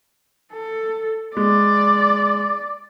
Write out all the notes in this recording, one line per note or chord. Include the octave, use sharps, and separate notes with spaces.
A4
G#3 D5